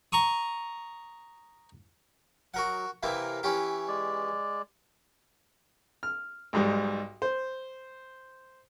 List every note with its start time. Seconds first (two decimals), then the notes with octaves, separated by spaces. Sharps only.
0.12 A#5 C#6 D#6
2.54 F#3 F#4 A#4 F#5
3.03 C3 E3 A#3 A#4
3.43 E3 C#4 G4
3.88 G#3 D5
6.03 F6
6.53 B1 G#2 G3
7.22 C5